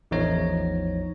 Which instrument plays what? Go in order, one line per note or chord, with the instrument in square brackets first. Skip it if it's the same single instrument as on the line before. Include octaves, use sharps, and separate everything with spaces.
[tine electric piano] A1 E2 F3 D#4 C#5 A#6